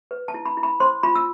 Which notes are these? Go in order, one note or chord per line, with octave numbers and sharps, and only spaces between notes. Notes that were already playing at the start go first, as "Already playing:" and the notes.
B4
A5
E4
B5
E4
B5
C5 C6
F4 B5
E6